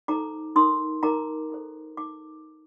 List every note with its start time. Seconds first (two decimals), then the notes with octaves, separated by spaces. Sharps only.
0.08 D#4 A4 C5 A#5 D6
0.56 D#4 A#4 C6 D#6
1.03 D#4 A#4 A#5 D6
1.50 D#4 A4 C5
1.97 D#4 D6